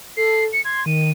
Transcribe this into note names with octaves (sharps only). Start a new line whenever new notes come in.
A4 C7
C#7
C6 G#6
D#3 D#7